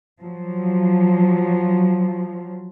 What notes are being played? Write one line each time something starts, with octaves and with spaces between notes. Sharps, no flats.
F3 F#3